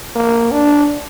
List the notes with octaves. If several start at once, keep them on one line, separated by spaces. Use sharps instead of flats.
A#3
D4